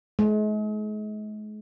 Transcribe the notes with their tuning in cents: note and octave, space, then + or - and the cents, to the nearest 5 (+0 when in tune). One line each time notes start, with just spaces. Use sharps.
G#3 +40